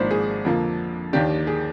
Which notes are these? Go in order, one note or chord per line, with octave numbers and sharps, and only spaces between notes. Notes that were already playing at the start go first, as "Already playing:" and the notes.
Already playing: G#1 G#2 F3 A#3 D4 C5
G#4
F2 D3 F3 A#3
D#2 D#3 A#3 D4 G4
G#4